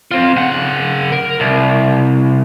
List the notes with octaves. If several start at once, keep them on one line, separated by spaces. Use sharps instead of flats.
C4 F4
C#3 F#5
A#4
C2